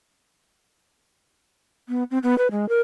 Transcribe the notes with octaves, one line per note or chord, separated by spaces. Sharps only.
B3
C4
B3
B4
G#3
A#4